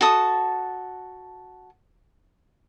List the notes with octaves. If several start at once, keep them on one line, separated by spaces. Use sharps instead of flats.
F#4 A4 A5 D#6